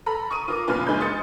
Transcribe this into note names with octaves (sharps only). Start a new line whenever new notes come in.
A4 A#5 B5
C#6 D#6 D#7
F4 A#4 D6
F#1 E2 A#2 C#3 F4 B4
F#2 G#3 B5 G6
C6 D#6 A6 C#7